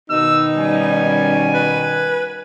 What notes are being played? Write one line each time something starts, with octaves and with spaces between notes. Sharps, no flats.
B2 D#3 D#4 E6
G3 C#4 G#5
B4